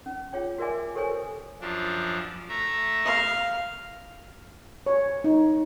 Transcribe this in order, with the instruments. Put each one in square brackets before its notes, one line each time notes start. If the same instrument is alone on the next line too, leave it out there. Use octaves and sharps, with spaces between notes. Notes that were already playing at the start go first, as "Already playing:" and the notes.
[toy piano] C#4
F4 G#4 C#5 G5
F#4 A#4 D5 E5 G#5 D6
G4 A4 A#4 C5 C#5 G#5
[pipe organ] F#2 F3 D4
A3 E5 A#5
[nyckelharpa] F5
[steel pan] C#5
D#4